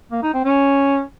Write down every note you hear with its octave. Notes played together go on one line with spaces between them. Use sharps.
A#3
D#4
C4
C#4